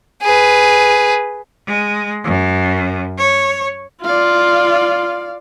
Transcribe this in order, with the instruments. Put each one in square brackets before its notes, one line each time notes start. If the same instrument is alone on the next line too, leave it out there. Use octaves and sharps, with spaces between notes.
[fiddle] G#4 B4
[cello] G#3
F#2
C#5
[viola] F4 [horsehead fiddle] D5 F5